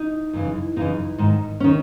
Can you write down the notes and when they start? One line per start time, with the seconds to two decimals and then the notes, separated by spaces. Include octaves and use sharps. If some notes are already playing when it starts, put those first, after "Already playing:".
Already playing: D#4
0.33 F#2 C#3 E3
0.76 F#2 C#3 E3 D#4
1.18 G#2 D#3
1.60 C#4
1.64 D#3